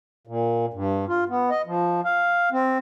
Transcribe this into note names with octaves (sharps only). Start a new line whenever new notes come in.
A#2
G2
F4
B3
D#5
F3
F5
C4